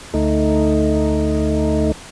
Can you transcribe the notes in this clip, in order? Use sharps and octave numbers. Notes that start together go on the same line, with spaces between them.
D2 A3 D#4